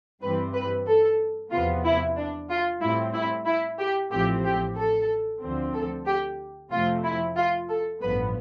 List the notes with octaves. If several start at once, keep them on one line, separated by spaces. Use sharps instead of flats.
G2 E3 G3 C4 B4
B4
A4
E2 C3 F3 B3 F4
E4
D4
F4
A2 G3 C4 E4
E4
E4
G4
A1 A2 F3 C4 G4
G4
A4
D2 D3 F3 C4
A4
G4
F2 C3 F3 A3 C4 F4
E4
F4
A4
A1 G2 F3 B3 B4